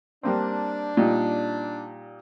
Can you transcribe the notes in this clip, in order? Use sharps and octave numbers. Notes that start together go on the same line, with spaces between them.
G3 A#3 C4 D4
A#2 G3 D#4